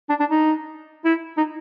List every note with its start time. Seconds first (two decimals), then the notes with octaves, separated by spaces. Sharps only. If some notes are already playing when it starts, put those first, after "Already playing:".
0.09 D4
0.20 D4
0.30 D#4
1.05 E4
1.37 D#4